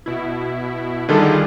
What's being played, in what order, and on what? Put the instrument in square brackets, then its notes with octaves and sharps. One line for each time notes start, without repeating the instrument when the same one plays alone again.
[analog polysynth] B2 E4
[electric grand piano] D3 D#3 A4 [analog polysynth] G3 F4 G#4